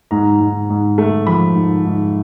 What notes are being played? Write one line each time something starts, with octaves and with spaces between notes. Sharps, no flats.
G#2 A#5
G#2
G#2
A3
F3 B5
G#2
G#2